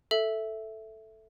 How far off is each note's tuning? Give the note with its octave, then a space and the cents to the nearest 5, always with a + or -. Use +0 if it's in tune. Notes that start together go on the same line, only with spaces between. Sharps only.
A4 +0 E5 +0